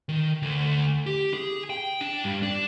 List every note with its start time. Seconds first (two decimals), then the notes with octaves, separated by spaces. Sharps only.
0.09 D#3
0.42 D2
1.06 G4
1.34 G#4
1.70 G5
2.01 D4
2.24 G2
2.43 D4